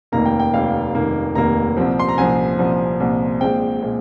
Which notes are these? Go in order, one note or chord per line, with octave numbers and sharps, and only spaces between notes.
F1 D#2 D#3 A#3 A#5
G5
G5
F1 D#2 D#3 A#3 F5
F1 D#2 D#3 A#3
F1 D#2 D#3 A#3 A#5
C2 A#2 F3 C4
C6
A#5
C2 A#2 F3 C4 G#5
C2 A#2 F3 C4
C2 A#2 F3 C4
A#1 A#2 G#3 C4 G5
A#2 G#3 C4